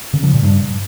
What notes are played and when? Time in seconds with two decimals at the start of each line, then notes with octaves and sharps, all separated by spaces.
0.14 C#3
0.23 F3
0.33 A#2
0.43 G2